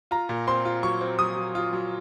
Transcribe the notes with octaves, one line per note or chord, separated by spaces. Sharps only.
F4 A#5
A#2
C4 C6
F4
F#3 C#6
C4
F#3 D#6
F#3
F4
F#3